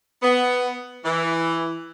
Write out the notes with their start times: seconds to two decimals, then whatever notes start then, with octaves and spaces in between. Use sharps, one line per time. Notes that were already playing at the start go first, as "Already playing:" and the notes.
0.22 B3
1.05 E3